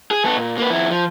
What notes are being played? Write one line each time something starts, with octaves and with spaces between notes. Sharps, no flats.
G#4
B3 A4
A#2
A#3 B4
F2 E4
F3